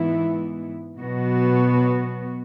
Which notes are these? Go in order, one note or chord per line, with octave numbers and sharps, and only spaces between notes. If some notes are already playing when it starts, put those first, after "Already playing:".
Already playing: G#2 E3 B3 E4
B2 F#3 B3 F#4